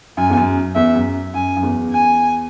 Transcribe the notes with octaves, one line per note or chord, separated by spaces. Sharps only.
F#2 G#5
E2
F#2
E2 E5
F#2
F#2 G#5
F#2
E2
G#5